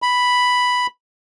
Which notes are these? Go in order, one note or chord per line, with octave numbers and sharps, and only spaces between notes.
B5